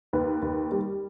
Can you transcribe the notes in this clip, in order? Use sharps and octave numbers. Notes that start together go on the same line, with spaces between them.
D#2 B4
D#2
G3